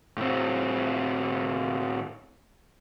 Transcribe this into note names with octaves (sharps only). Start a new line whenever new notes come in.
A2 C4